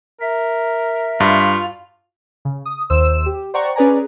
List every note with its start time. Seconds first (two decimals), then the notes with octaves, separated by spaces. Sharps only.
0.21 A#4 E5
1.20 G2 F4
2.45 C#3
2.65 D#6
2.90 D#2 C5 E6 E7
3.26 G4
3.54 C5 D5 F#5 G5 A#5 C#6
3.76 C#4 G#4 B4 D5 G#5 A#5